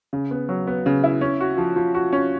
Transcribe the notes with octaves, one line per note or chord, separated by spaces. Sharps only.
C#3
B3
F#3
B3
C#3
E4
C#4
F#4
F3
F3
F#4
C#4